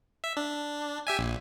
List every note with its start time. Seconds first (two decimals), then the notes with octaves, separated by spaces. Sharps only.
0.24 E5
0.37 D4
1.07 G4 E5 G#5
1.19 A#1